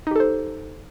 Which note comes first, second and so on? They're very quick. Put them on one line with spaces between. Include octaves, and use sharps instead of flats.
D#4 G4 A4 C5